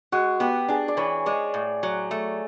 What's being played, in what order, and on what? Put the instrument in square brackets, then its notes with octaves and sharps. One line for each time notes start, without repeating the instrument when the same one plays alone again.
[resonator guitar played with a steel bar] G#3 [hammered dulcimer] F#4
[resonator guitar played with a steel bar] B3 [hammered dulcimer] G4
[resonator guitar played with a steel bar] D4 [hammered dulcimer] G#4
[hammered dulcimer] D5
[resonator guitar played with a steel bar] E3 [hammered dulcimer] C#5
[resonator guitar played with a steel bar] G#3 [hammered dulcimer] D5
[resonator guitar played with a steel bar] A2
F#3
A3